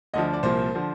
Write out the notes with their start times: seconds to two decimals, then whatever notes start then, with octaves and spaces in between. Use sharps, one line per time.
0.13 D2 D3 F3 D#5
0.33 D5
0.43 C2 A#2 F3 C5
0.75 D3 F3